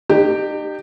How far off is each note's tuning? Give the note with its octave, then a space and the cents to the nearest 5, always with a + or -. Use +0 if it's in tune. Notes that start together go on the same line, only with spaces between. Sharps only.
D#4 -40 G4 +0